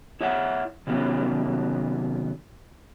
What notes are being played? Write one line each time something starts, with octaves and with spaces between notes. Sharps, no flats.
E4 C#5 E5 F#5
C3 D#3 F#3 B3 C#4